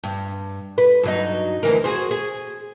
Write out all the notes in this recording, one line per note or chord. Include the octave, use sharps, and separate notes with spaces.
G2
B4
G2 F#3 D#4
D2 E3 A#4
F#4 G#4 C5
G#4